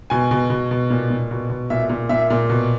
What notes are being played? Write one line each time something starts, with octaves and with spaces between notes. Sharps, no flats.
B2 G#5
B2
B2
B2
A#2
A#2
B2
B2
A#2 E5
A#2
A#2 E5
A#2
B2